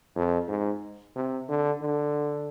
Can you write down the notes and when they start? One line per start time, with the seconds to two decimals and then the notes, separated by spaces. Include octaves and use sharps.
0.15 F2
0.48 G#2
1.16 C3
1.49 D3
1.82 D3